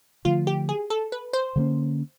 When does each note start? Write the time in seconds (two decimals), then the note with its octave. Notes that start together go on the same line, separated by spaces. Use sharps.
0.25 D3 F3 A3 F4
0.47 G4
0.69 G#4
0.90 A4
1.12 B4
1.33 C5
1.56 D3 F#3 A#3 C#4